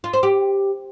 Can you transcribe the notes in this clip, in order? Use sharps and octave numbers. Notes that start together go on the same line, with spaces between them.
F4
C5
G4